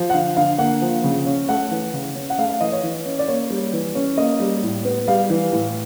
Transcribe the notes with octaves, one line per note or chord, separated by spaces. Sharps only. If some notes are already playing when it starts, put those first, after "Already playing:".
Already playing: F3
F#5
D3 F5
D3 F5
A#3 F#5
F3
C#3
C#4
A3 F#5
E3
C#3
C#4
F#5
A3 F5
F5
E3 D#5
C#5
E3
C#4
D5
A#3 C#5
G3
E3
C#4
A#3 D#5
G3
A2
B3
G3 F5
E3
A2